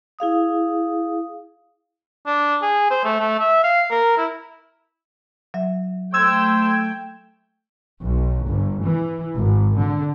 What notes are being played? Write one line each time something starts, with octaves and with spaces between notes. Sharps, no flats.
E4 G#4 F5 D#6
D4
G#4
C5
A3
A3
E5
F5
A#4
E4
F#3 E5
A3 C5 G5 E6 G#6 E7
B1
G1
E3
G#1
D3